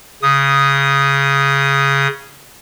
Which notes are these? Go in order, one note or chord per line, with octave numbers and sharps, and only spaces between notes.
C#3 D#6